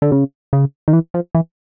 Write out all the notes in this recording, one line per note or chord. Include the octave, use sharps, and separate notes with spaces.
D3
C#3
C#3
D#3
E3
F3
E3